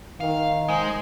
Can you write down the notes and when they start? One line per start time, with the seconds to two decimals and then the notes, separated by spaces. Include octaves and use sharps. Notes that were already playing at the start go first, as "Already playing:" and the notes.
0.20 D#3 F5
0.69 G#3 C5 G#5